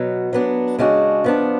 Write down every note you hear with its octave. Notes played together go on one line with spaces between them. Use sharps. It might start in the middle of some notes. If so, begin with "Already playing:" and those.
Already playing: B2 F#3 B3
F#3 B3 D4
C#3 G#3 D4 F#4
F3 B3 D4